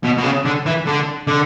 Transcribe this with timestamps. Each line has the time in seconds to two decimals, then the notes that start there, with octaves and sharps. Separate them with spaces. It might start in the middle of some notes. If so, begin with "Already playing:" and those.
0.03 B2
0.17 B2
0.23 C#3
0.45 D3
0.66 E3
0.87 D3
1.27 D3